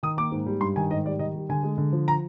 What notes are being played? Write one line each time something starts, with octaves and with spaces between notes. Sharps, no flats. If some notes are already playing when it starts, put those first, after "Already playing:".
D#3 D#6
A#3 D6
G#2
G3
G2 C6
D#3 G#5
G#2 D#5
G3 D5
D#3 D#5
G3
D3 G#5
G#3
D3
F3
A#5